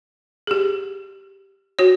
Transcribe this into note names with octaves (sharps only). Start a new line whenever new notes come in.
G4 G#4
F#4 C#5